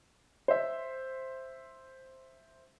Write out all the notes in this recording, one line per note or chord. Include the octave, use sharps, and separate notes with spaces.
C5 E5